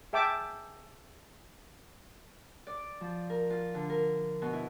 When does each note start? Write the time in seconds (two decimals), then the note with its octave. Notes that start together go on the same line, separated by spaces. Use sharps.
0.13 G#4 E5 G5 A5 D6
2.67 D5
3.01 F3
3.30 A#4
3.50 F4
3.74 D3
3.90 A#4
4.42 B2
4.53 E4